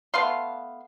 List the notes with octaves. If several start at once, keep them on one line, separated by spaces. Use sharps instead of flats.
A3 B3 F5 C6